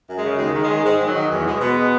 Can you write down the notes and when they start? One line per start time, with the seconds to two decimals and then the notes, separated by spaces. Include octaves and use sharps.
0.08 F#2
0.16 G#3
0.24 C#3
0.38 D#2 G#3
0.54 D#3
0.62 G#3
0.70 D#3
0.85 G#2 G#3
1.00 D#3
1.07 F#3
1.15 D#3
1.31 E2
1.45 B2 G#3
1.61 B2 G#3 B3